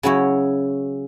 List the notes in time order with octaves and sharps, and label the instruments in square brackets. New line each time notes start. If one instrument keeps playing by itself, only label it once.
[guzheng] C#3 F#3 C#4 E4 C#5